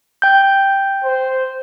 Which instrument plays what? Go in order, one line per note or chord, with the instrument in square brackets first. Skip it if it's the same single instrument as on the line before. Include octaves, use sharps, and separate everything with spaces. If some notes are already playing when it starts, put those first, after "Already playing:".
[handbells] G5 G6
[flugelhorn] C5